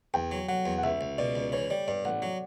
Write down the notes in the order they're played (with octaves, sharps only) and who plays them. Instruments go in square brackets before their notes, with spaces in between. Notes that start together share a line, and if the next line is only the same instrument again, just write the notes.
[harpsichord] E2 [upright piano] G5
[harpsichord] F#3
[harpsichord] F#3 [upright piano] F#5
[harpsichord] E2
[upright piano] F#5
[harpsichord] C#2 [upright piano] E5
[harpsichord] C#2
[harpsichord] B2 [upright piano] D5
[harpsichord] C#2
[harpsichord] E3 [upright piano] C#5
[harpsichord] G3 [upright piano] D5
[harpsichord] G2 [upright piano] D5
[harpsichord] A1 [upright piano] F#5
[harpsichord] F#3